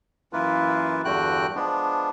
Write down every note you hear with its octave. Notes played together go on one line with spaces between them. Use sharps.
F#2 E3 A#3 E4 F4 B4
E2 G2 D3 F#4 G5 F#6
F3 G#3 B3 D4